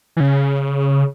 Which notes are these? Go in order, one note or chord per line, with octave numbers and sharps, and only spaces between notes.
E3
C#3